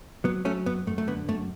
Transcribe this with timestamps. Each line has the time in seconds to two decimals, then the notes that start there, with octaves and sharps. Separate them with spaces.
0.24 F#3 B3
0.45 F#3 A3 C#4
0.66 F#2 B3
0.87 F#2 A3
0.98 A3
1.07 D3 B3
1.28 F#2 A3